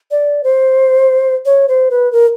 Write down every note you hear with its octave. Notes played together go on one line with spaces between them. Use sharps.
D5
C5
C#5
C5
B4
A#4